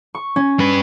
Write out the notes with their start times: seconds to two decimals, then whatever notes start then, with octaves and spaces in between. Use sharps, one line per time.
0.15 C#6
0.36 C#4
0.59 G2 B4